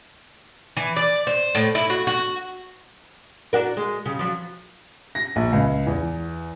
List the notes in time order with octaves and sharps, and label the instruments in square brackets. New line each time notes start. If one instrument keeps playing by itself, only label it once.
[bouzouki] E3
D5
C5
A2
E4
F#4
F#4
[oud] D4 F#4 A#4
G#3
C#3 G3
F3 F#3
[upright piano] A#6
A#1
C#2
E2